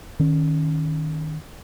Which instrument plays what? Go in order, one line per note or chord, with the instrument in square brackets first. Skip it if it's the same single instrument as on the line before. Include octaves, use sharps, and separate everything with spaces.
[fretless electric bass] D#3 C#4